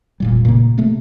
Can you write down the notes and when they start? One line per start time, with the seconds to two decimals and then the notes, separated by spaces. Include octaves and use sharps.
0.20 F1 A#2 G3
0.45 A#2 C#3 A#3
0.78 C3 A3 A#3